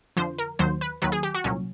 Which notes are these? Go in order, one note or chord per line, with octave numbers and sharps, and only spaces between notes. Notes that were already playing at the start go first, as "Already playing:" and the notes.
F2 D3 F3 C5
A#4
D#2 D#3 F#3 C5
B4
D#2 D#3 F#3 B4
G#4
G4
F#4
C2 A#2 F#3 C#4